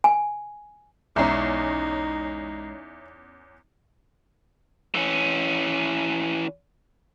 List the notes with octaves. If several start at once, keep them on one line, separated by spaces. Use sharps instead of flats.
G#5
B1 E2 G#3 C#4 D#4 E5 A#5 C7
E3 C#4